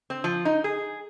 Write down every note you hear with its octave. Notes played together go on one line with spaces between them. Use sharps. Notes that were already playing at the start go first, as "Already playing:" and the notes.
C4
F3
D#4
G#4